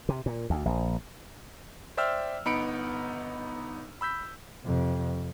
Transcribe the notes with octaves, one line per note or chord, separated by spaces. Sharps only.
C3
A#2
D2
A#1
C5 D5 E5 G5 E6 F6
G1 B3 D#4 B5 C#7 D7
B5 E6 G6 B6
F2 C3